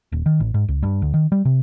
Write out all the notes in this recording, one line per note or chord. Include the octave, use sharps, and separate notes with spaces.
D#1
D#3
A1
G#2
C#2
G2
D2
D#3
G3
C3